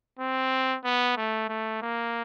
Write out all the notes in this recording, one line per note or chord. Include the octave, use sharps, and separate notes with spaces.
C4
B3
A3
A3
A#3